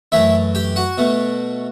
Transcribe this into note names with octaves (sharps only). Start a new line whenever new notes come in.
F#2 E3 A3 E4 E5
G4 G5
F#4 F#5
B2 A3